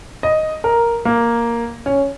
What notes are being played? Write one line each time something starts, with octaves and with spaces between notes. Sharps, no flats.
D#5
A#4
A#3
C#4